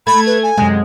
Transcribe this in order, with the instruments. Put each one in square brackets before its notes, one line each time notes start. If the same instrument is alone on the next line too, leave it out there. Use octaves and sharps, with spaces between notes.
[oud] A3 [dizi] B5 [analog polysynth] G#6
[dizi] B4
G#5
[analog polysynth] F#2 G#3 [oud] C3